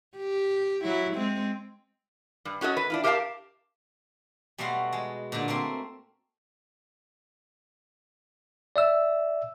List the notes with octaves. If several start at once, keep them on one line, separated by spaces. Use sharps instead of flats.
G4
F#3 E4
G#3 C4
G2
C#4 F#4 A4 D#5
B4
D4 E4 F4
G4 A#4 C5 E5 F5 A5
B2 G3 A3 F#4 F5 C6
G#3
A#2 D3
A3 A#3 C4 C6
D5 E5 E6